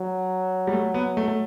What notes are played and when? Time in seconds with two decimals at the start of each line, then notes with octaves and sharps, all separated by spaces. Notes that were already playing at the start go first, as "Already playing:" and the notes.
Already playing: F#3
0.67 G3
0.73 A3
0.94 B3
1.17 A3
1.28 A3